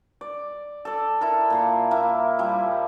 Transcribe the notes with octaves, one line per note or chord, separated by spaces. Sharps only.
D5
A4 D5
E4 A4 A#4
A#2 A#3 C6
A#3 E4
F3 G3 E4